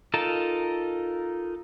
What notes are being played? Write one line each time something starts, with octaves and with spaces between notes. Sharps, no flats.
D#4 F4 A4 A#4 A5